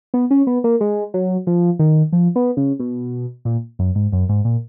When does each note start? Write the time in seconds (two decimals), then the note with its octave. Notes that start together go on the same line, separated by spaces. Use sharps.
0.14 B3
0.31 C#4
0.47 B3
0.64 A#3
0.81 G#3
1.14 F#3
1.47 F3
1.79 D#3
2.13 F3
2.36 B3
2.57 C#3
2.79 B2
3.45 A#2
3.79 F#2
3.95 G#2
4.12 F#2
4.29 G#2
4.45 A#2